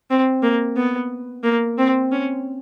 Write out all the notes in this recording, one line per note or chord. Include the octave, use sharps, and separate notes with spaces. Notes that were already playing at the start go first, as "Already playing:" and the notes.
C4
A#3
B3
A#3
C4
C#4